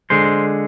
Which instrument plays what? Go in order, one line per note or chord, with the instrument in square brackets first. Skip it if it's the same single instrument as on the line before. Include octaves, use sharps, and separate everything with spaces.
[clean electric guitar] D3 G#3 C5